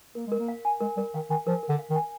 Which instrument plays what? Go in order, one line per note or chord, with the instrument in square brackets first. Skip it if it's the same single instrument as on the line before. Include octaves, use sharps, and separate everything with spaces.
[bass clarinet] A#3 [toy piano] A#4
[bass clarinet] G#3 [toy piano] A#4
[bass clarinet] A#3
[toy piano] F5
G#5
[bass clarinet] G#3 [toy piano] A#4
[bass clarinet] G3 [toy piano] A#4
[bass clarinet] D#3 [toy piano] F5
[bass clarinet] D#3 [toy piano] G#5
[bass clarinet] F3 [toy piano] A#4
[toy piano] A#4
[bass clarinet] D3
[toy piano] F5
[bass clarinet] D#3
[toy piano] G#5